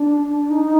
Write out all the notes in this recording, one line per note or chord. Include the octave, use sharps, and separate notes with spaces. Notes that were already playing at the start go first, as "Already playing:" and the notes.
Already playing: D4
D#4